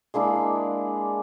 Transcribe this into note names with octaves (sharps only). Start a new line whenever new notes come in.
G#3 A#3 D4 E4